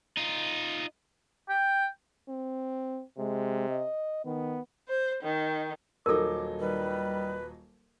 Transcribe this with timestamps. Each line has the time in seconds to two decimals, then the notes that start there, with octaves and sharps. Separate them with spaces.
0.17 D#4 F4
1.49 G5
2.29 C4
3.18 C3 G#3
3.69 D#5
4.25 D#3 B3
4.90 C5
5.25 D#3
6.06 D#1 F#3 D#4 A4 A#4 D6
6.60 D#3 G3 B4